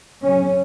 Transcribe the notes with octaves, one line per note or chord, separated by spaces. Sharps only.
F#2 C#3 C#4